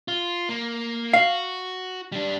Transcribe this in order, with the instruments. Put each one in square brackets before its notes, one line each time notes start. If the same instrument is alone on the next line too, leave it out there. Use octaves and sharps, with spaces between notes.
[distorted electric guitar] F4
A#3
[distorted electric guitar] F#4 [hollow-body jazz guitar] F5
[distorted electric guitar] G3 D4